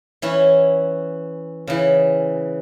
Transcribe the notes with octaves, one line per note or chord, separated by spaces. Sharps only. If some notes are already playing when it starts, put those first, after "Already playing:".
E3 C#4 E4
C#3 E3